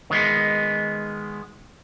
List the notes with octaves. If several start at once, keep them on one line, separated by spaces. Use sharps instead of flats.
D#3 G#3 B3